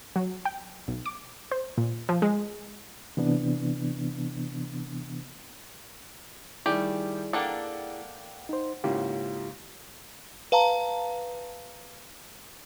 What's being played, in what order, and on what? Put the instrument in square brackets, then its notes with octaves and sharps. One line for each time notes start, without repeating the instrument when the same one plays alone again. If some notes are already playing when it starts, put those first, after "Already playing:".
[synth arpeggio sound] F#3
G5
B1
D6
C5
A#2
F3
G#3
[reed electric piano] C3 E3 B3 D4
[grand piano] D#3 G3 [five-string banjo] A3 G4 [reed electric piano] E4 G#4 D5
[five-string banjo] A#3 D4 A4 [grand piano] F#5 G5
[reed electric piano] D#4 C5
[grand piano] G#2 C#3 A#3 [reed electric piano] E4 F4 G4
[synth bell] B4 F5 A5 A#5